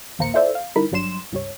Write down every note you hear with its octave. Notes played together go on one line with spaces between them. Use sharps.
A#1 D#2 A#3 C5 A#5 C#7
E4 F4 A4 C5 D5 E5
F5
D3 G3 D#4 E4 A#4 B5
G#1 G2 F#3 D4 C6 E7
C#2 G2 G3 C#5